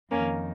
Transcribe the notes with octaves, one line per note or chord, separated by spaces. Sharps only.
F2 D#3 A#3 C#4